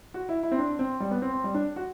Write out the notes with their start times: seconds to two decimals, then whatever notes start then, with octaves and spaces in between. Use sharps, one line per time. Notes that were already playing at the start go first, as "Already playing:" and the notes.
0.14 F#4
0.29 E4
0.43 E4
0.52 C4
0.58 D4
0.79 C4
1.00 G3
1.11 B3
1.22 C4
1.33 C4
1.44 G3
1.54 D4
1.76 F#4